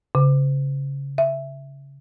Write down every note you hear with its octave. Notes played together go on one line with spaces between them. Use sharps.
C#3
E5